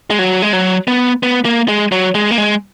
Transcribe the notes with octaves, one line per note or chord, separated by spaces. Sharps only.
G#3
F#3
G#3
F#3
B3
B3
A#3
G#3
F#3
G#3
A#3
G#3